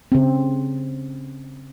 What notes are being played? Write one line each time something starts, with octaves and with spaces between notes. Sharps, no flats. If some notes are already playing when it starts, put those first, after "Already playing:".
C#3 C4